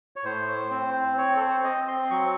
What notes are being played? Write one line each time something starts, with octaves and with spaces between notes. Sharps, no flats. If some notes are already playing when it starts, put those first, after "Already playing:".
C#5
A2 C5
C4
C4 C#5
A4
C5
C4 D#5
C6
F#3 C#6